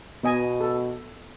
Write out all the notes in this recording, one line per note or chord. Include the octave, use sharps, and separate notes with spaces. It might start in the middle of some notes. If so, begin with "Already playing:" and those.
B2 B3 D#5 G#5
A4